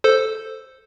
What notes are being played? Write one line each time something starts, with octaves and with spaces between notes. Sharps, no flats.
A4 C5